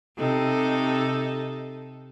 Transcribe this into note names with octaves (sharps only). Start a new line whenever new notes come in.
C3 D#4 A4